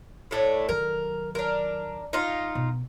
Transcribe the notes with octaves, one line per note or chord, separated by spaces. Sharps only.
A2 A3 D4
D#3 F#3 A#4
D4 A#4
D#4 F4
B2